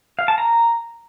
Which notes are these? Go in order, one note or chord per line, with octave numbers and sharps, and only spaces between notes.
F5
A5
A#5